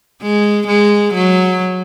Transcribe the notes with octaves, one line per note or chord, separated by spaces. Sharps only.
G#3
G#3
F#3